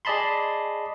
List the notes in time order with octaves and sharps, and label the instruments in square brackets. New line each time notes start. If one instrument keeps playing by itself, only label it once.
[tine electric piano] G#4 D5 D#5 A5 B5 C6